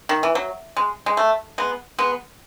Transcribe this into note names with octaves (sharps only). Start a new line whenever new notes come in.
D#3
E3
F#3
G#3
G#3
A3
G#3 B3
G#3 B3